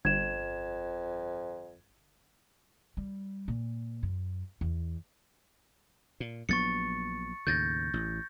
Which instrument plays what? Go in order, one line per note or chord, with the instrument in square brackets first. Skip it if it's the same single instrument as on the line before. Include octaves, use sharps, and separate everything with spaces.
[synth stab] G1 [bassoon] F2 [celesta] G#6 E7
[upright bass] G3
A#2
F#2
E2
[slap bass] A#2
[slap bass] A#1 F#3 B3 [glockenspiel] C#6 A6 C#7
[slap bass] D#2 A2 C#3 [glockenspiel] G6 A6 A#6
[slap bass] A1